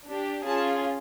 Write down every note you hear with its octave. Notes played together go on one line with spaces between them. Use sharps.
D4 G4
C#4 F4 G#4 A5